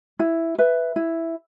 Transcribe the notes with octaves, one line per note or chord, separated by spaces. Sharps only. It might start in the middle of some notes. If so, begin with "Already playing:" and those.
E4
B4 E5
E4